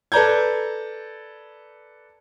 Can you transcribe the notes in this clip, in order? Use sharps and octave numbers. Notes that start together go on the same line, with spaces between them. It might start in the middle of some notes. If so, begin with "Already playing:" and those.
A4 B4 D5 A#5 G6 G#6